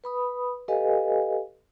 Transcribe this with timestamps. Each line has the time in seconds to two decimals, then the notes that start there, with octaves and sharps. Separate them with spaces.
0.04 B4 B5 D#6
0.68 G4 A4 B4 D#5 F5 G#5